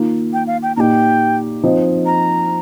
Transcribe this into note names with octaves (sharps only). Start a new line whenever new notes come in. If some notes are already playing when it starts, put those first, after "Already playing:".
Already playing: D#3 A#3 F4
G5
F5
G5
A#2 A#3 D#4 G4 G5 A#5
F3 C4 D#4 C5 D#5
A#5